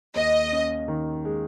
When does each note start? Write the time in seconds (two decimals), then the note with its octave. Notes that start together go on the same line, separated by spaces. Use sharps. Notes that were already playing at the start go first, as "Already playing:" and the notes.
0.15 D#2 D#5
0.52 C#4
0.88 D#3
1.25 G#3